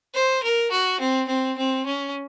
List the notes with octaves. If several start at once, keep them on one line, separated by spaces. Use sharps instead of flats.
C5
A#4
F#4
C4
C4
C4
C#4